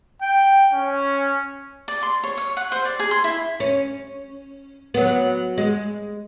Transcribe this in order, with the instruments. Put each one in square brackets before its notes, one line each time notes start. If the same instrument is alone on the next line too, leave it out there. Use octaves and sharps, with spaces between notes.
[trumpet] G5
C#4
[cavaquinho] D5
C6
C#5
C#5
F#5
C5
D5
G#4
C6
E4
[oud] C#4
F#3 B3
G#3